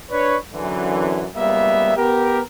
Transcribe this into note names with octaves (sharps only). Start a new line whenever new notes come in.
D4 B4 C#5
F#2 D3 E3
C#2 G3 A#3 B3 E5
B3 G4 A#4